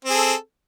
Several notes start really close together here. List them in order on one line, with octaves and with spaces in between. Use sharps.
C4 G#4 A4